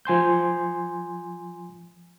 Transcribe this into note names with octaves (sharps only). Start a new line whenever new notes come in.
F3 G#5 C6 G6